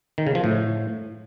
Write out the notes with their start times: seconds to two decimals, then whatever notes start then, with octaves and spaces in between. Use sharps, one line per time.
0.18 D#3
0.27 C#3
0.35 F3
0.44 A2